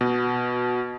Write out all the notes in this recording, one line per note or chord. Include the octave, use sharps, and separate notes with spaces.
B2